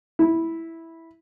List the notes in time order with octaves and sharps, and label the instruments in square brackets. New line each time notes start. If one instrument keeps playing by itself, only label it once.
[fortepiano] E4